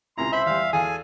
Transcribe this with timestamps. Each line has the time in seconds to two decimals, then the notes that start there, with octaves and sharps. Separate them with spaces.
0.17 C#2 C3 E4 A#5 C6
0.32 C5 E5 B5
0.46 E2 G3 F5
0.73 E2 G#4 A4 F5 G#5